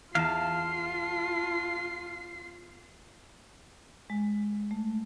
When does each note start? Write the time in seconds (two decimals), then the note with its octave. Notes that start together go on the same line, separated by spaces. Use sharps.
0.15 E2 F4 F5 A5 C7
4.10 G#3
4.71 A3